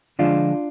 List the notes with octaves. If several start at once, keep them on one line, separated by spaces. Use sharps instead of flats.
D3 F3 G#3 D4 F4